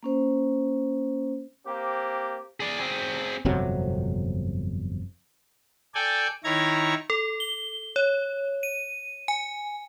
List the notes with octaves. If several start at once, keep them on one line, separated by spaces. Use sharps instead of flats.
A#3 C#4 C5
A#3 C4 G4
G#4 D5
C4 G#4
G1 F2 C3 F#3
A4 D5 G5 G#5
D#3 E4 C#5 A#5 G#6
A4
G7
C#5
D#7
G#5